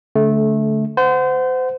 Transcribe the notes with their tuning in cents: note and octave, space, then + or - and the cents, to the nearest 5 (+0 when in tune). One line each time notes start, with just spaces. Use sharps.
D3 -35 A3 -20
C5 -30 F#5 +0